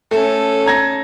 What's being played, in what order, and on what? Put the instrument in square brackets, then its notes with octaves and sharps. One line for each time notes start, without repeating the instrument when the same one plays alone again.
[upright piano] A3 [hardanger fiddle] C#4 A4
[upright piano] A#5 G#6 A#6